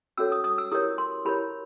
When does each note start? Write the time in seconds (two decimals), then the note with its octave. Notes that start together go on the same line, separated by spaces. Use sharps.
0.18 C#4 F#4 A4 C#5 E6
0.32 D#6
0.44 D#6
0.58 E6
0.72 E4 G4 A#4 C#5 D#6
0.98 C6
1.25 E4 G4 A#4 C#5 B5